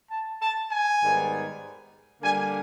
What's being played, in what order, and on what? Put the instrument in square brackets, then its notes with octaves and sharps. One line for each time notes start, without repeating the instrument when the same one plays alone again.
[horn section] A5
A5
G#5
G#2 D#3 G3 B3
D3 G3 A#3 G#5